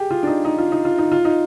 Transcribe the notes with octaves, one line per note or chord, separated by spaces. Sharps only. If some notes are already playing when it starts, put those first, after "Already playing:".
Already playing: G4 G#4
F4
D4
D#4
D#4
F4
D#4
F4
D#4
F4
D#4